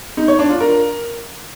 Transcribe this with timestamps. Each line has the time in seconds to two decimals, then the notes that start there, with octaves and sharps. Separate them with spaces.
0.17 D#4
0.28 C#5
0.39 D4
0.50 F4
0.60 A#4